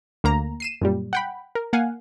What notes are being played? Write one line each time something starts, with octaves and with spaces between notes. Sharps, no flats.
D2 A#3 A#5
C7 D#7 E7
F#2 A#2 G3
F#5 G5 B5
A#4
A#3 F5 F#5 G#5